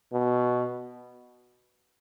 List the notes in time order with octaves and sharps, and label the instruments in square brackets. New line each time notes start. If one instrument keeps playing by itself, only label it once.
[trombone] B2